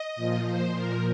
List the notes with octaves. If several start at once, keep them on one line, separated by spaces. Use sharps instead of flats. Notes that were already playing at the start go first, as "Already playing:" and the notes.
Already playing: D#5
A#2 F3
C5
A#2 F3 A#4